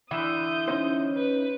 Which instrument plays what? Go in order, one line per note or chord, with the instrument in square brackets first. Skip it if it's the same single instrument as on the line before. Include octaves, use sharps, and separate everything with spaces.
[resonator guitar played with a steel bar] D3 E3 E4 [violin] D#6 G6
[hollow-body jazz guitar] C#4 D#4 C5
[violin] B4